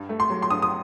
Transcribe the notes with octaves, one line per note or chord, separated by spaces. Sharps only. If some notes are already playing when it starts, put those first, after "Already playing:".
Already playing: G2
A3
C6
F#3
C6
G2 D#6
D#6